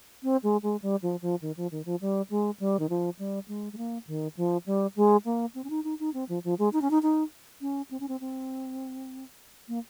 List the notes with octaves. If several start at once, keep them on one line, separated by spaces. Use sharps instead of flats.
C4
G#3
G#3
G3
F3
F3
D#3
F3
D#3
F3
G3
G#3
G3
D#3
F3
G3
G#3
G#3
A#3
D#3
F3
G3
G#3
A#3
C4
C#4
D#4
D#4
D#4
C4
F3
F3
G#3
D#4
C#4
D#4
D#4
C#4
C4
C#4
C4
C4
A#3